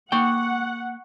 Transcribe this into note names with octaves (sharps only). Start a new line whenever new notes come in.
A#3 F#5 G5 C#6